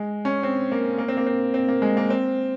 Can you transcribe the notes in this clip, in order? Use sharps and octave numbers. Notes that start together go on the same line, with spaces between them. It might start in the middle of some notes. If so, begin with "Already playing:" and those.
Already playing: G#3
C#4
C4
A#3
A#3
C4
A#3
C4
C4
A#3
G#3
A#3
C4